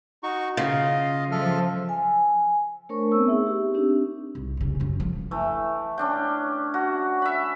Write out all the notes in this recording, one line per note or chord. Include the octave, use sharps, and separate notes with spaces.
D#4 F#4 C#6
C#3 F4 D#5 F5
F3 A4 E5 F6
G#5
A3 D4 A#4 C5 C#5 C#6
B3 C4 C#6 E6
D#4 G#4 E5
G4
C4 D4 D#4 G4
C2
F1 C#3
F#2 C#4
D3 F3
E3 A3
C#4 D4 G5
F#4
E5 B5